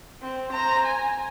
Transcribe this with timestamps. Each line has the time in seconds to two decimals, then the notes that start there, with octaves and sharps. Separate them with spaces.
0.22 C4
0.52 C5 A#5
0.86 G#5